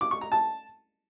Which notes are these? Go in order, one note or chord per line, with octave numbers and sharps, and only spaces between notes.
D6
C#6
A#5
A5